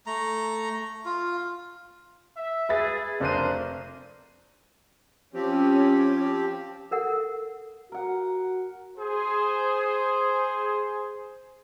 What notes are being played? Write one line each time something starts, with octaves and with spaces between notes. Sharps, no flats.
A3 A#5
F4
E5
G#4 B4 E5 A6
F1 D4 A#4 C5 F#6 D#7
F3 C4 C#4 G4
A4 A#4 F#5
F#4 A#4 F#5
G#4 C5